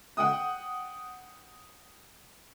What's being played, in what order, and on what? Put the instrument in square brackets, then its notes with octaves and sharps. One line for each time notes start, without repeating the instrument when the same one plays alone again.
[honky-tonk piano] F#5 G5 D#6